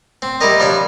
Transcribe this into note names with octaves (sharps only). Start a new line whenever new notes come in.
C4
G3 E4 G4 A#4 D#5
F3 G3 D4 C#5